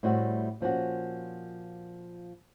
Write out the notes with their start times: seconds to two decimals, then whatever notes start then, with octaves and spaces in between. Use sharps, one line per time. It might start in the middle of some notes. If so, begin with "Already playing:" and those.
0.03 A2 G3 A3 C4 F#4
0.60 A#2 F3 C#4 F#4